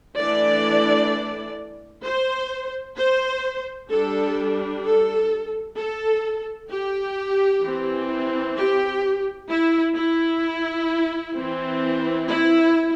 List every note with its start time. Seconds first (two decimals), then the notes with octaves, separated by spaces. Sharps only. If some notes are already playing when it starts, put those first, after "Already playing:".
0.18 E3 A3 D4 D5
2.04 C5
2.97 C5
3.90 G3 D4 A4
4.83 A4
5.76 A4
6.70 G4
7.63 E3 C4
8.56 G4
9.49 E4
9.95 E4
11.35 E3 C4
12.28 E4